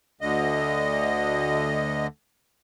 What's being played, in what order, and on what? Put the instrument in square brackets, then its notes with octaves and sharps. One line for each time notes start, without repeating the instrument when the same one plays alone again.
[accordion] D2 D3 D#5